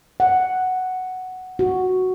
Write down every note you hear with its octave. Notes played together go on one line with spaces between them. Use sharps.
F#5
F#4